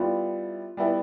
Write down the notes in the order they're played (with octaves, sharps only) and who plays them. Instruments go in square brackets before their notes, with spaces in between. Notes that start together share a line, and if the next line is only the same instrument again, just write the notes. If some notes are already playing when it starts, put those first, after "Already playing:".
Already playing: [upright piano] G3 B3 E4 [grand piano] F4
[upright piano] G3 B3 E4